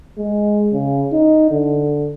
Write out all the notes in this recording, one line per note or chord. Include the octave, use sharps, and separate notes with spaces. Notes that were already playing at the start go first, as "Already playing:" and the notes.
G#3
C#3
D#4
D3